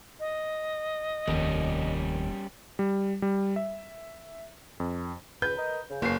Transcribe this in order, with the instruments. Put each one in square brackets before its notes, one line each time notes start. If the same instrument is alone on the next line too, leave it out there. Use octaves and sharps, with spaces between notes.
[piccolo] D#5
[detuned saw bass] F1 [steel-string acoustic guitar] D#2 [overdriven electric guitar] G3 C#4
[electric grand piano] G3
G3
E5
F2
[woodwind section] C#2 [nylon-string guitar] B4 [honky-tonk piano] G6
[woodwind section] A#4 D#5
C#3
[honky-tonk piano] F#1 C7 [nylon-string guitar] A#3 [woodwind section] B3 G#4 C#5